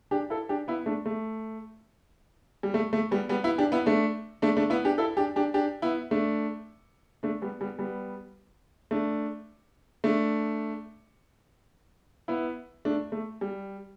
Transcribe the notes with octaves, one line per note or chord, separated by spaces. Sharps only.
D4 G4
E4 A4
D4 G4
B3 E4
A3 D4
A3
G3
A3
A3
G3 B3
G3 B3
B3 E4
D4 G4
B3 E4
A3 D4
A3 D4
A3 D4
B3 E4
D4 G4
E4 A4
D4 G4
D4 G4
D4 G4
B3 E4
A3 D4
A3 D4
G3 B3
G3 B3
G3 B3
A3 D4
A3 D4
B3 E4
A3 D4
A3
G3